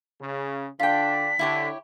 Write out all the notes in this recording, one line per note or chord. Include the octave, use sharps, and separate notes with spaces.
C#3
D3 D4 F4 G5 B6
D3 E4 G4 C#5